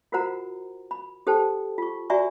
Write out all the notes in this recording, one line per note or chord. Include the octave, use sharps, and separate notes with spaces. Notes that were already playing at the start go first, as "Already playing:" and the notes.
F4 F#4 A#4 C5 F#5 A#5
B5
G4 A4 C5 G5 A5
F4 C#6
F#4 D5 E5 G#5 A#5 C#6